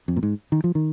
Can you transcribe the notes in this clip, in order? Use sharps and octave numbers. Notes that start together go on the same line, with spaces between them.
F2
A#2
G#2
D#3
F3
D#3